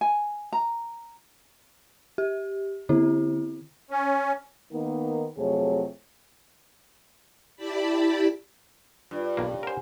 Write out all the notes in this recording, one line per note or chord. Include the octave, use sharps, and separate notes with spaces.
G#5
A#5
G4
D3 C4 E4 G4
C#4
D#3 A#3 B3 D#4
F2 C3 F#3 A3 G#4 C#5
E4 G4 D5 A5 B5
G2 F4 B4 D5
B1 A#3
C#5
A#4 C5 F#5 G#5